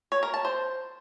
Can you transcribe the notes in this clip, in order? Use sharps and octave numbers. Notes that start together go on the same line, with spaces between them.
C#5
A#4
A5
C5